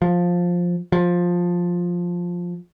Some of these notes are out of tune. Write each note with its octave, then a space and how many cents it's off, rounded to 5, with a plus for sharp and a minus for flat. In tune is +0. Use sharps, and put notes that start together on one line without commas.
F3 +10
F3 +10